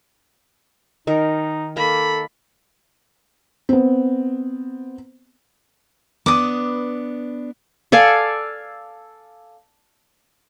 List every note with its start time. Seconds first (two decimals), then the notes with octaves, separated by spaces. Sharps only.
1.07 D#3 D#4 A#4
1.77 A#3 A4 B5
3.69 B3 C4
6.26 B3 D4 D6 D#6
7.92 A4 D5 F5 G#5